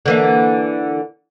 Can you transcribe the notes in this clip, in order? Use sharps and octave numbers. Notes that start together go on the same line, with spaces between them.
D3 E3 A#3